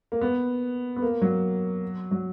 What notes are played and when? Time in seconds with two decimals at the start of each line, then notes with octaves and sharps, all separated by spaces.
0.12 A#3
0.21 B3
0.96 B3
1.02 A#3
1.22 F#3
2.11 F#3